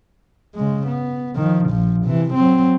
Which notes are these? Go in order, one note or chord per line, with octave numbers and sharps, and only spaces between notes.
C#3 G#3
B3
D#3 F3
A#1 F3
C3 E3
F#3 C4